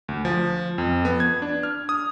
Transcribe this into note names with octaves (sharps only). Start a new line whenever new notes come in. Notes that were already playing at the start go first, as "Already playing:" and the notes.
D2
F3
F2
B3
G#6
D4
F6
D#6